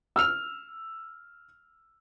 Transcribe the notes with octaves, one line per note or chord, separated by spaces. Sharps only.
E6 F6 F7